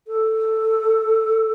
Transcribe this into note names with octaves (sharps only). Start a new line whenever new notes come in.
A4